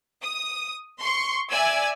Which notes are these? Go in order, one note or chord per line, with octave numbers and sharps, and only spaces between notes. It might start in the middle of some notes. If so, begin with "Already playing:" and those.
D#6
C6 C#6
D5 E5 G#5 E6 G#6